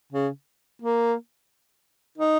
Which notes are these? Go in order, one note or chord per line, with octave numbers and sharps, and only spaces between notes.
C#3
A#3
D#4